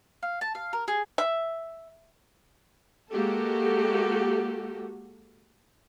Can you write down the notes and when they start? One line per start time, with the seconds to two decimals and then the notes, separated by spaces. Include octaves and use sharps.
0.23 F5
0.41 A5
0.55 F5
0.73 A#4
0.88 G#4
1.18 E5
3.11 G#3 A#3 F#4 G4 A4